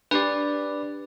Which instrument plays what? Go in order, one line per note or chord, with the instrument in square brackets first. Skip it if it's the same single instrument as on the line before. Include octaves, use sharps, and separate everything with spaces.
[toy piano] D4 G4 [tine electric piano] B4 D5